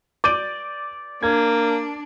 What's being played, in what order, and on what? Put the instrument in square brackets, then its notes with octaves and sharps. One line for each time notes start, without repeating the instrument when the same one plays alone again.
[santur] D5 [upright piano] D6 G6 D#7
[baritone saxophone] A#3 [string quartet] D4 [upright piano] G#6